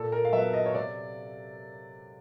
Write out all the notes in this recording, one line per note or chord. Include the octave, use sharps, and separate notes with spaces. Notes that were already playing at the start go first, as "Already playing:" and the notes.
Already playing: A#2 A4
A#4
F5
F#3 B3 E5
D#5
C#5
C3 D5